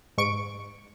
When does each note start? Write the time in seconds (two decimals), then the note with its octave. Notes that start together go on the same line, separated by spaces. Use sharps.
0.18 G#2 C#6 D7